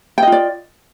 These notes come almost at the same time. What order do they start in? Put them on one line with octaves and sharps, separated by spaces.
G5 D#5 F4 D5